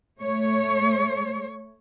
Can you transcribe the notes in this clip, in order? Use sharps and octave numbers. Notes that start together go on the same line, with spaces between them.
A3 C#5